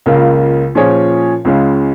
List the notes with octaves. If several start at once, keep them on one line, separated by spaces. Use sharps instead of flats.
C#2 C#3 A#3 F4 A#4
A#2 F3 C#4 G#4 C#5
C#2 C#3 G#3 C#4